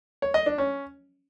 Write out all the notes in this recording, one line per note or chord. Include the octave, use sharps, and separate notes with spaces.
C#5
D#5
D4
C#4